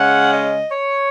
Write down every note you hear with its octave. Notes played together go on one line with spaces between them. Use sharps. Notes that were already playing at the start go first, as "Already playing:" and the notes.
Already playing: C#3 G#3 C#4 F#5
D#5
C#5